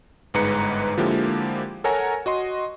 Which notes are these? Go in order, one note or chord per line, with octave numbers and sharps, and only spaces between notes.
G1 G#2 G#3 B4 A#5 C#7
D3 F3 G#3 A#3 E4 G4
A4 A#4 C#5 F#5 G#5 A#5
F#4 D#5 C6